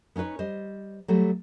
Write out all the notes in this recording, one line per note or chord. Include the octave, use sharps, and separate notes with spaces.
B3 C#4 D#4 B4 C#5
G3 C5 D#5
F#3 G3 A3 G4 A4